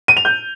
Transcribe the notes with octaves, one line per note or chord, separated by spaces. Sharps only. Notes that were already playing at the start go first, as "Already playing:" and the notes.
D#7
F7
G6